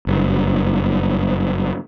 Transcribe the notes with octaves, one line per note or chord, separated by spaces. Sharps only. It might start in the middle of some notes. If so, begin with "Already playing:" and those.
F#1 G2